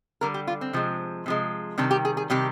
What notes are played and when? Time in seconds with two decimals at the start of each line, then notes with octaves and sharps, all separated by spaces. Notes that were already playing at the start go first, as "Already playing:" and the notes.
0.21 D3 G3 A#4
0.34 G4
0.47 F4
0.61 C4
0.73 C3 F3 G#3
1.26 C3 F3 G#3
1.78 C3 D#3 G3 D4
1.91 G4
2.05 G#4
2.17 G#4
2.30 C3 D#3 G3 G4